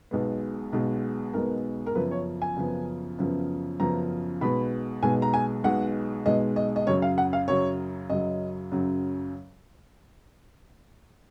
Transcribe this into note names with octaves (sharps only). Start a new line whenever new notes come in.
B1 B2 G#3 B3
B1 B2 G#3 B3
B1 B2 G#3 B3 A#4
A#4
F#2 C#3 F3 B3 B4
C#5
G#5
F#2 C#3 F3 B3
F#2 C#3 F3 B3
F#2 C#3 F3 B3 A#5
B1 B2 G#3 B3 B5
B1 B2 G#3 B3 G#5
A#5
G#5
B1 B2 G#3 B3 F#5
B1 B2 G#3 B3 D#5
D#5
D#5
F#2 C#3 F#3 C#5
F5
F#5
F5
F#2 C#3 F#3 C#5
F#2 C#3 F#3 D#5
F#2 C#3 F#3